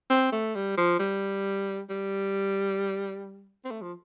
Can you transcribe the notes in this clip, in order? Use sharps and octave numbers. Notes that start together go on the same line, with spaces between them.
C4
A3
G3
F3
G3
G3
C4
A3
F3